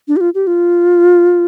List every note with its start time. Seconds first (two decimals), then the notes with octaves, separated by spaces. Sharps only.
0.08 D4
0.17 G4
0.21 F4
0.34 G4
0.47 F4